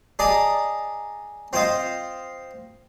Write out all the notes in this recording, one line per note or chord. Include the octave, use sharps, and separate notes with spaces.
G#4 D5 D#5 A5 A#5 D#6
C4 F4 C5 D#5 F5